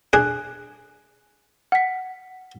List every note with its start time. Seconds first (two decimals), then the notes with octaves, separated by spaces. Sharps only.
0.13 D4 G#4 F#6
1.72 F#5 B6